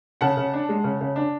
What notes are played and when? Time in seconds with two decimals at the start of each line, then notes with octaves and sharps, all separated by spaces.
0.21 C#3 F#5 A5
0.37 C#3
0.53 D4
0.69 G#3
0.84 C#3
1.01 C#3
1.16 D4